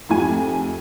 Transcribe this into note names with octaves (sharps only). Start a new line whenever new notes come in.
F2 G#2 F3 A3 G4 G#5